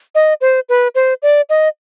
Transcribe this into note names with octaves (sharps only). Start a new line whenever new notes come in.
D#5
C5
B4
C5
D5
D#5